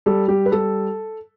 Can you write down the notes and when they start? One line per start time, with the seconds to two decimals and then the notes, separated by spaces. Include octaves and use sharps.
0.06 G3 A4
0.28 G3 G4
0.46 B4
0.52 G3 A4